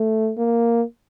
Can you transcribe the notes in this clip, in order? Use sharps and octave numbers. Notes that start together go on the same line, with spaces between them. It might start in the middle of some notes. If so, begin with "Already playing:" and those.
Already playing: A3
A#3